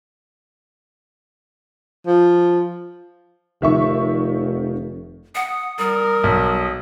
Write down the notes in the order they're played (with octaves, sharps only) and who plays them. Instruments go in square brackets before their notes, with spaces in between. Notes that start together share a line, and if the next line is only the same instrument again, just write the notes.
[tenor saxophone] F3
[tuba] F1 [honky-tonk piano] D#3 E5 C#6
[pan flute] F#5 [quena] D#6
[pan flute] G3 [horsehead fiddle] A#4
[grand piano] B1